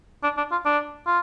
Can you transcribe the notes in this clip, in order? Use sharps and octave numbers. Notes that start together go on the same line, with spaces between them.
D4
D4
F4
D4
F4